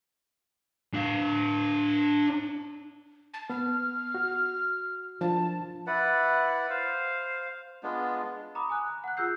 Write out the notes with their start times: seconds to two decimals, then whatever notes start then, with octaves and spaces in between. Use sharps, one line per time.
0.94 D4 F5
3.34 A5
3.50 B3 F6
4.15 F#4
5.21 F3 D4 A5
5.87 E4 B4 D5 F#5
6.70 C5 F5
7.83 G#3 B3 D4 F4
8.55 A#5 B5 D6 D#6
8.70 G#5 D#6 F#6
8.89 A#5
9.04 F#5 F#6
9.17 F4 G#4 E6 G6 C7